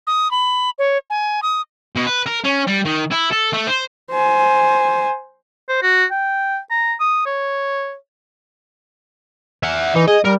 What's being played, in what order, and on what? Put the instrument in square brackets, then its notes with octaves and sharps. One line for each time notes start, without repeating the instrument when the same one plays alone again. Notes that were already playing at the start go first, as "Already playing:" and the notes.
[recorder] D#6
B5
C#5
G#5
D#6
[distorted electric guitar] B2
B4
A#4
C#4
G3
D#3
E4
A4
A3
C5
[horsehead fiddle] C5 G#5
[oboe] C5
F#4
G5
A#5
D#6
C#5
[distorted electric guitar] E5 F#5
[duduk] E3 [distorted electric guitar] D#4
[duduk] G#4 [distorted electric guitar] D#5
[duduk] G3 [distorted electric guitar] A#4